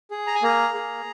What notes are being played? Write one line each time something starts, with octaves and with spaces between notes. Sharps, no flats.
G#4
A#5
G#5
A#3 A#5
G#4